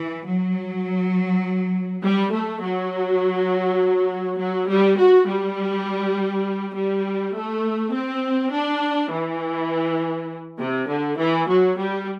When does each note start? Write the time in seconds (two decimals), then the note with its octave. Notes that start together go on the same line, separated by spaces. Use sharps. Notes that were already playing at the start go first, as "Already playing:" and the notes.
Already playing: E3
0.25 F#3
2.03 G3
2.32 A3
2.61 F#3
4.38 F#3
4.69 G3
4.98 F#4
5.27 G3
6.75 G3
7.34 A3
7.93 C4
8.52 D4
9.11 E3
10.58 C3
10.87 D3
11.17 E3
11.47 F#3
11.77 G3